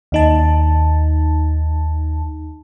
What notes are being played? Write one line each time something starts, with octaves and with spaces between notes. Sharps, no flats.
D#2 D#4 A5